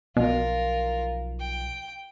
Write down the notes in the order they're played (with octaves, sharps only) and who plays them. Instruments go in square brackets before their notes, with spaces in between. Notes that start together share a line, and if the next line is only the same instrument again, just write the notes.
[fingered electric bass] B1 F3 [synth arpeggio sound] B2 [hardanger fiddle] F4 A#4
[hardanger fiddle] G5